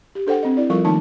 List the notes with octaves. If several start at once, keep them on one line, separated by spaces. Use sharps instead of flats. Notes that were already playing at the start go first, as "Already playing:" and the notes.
G4
D4 A4 C5 F#5 G5
C4 D#5
E4 D5
F3 G3 F4 A4 A#4 C#6
D#3 F3 A3 A#3 D#4 A5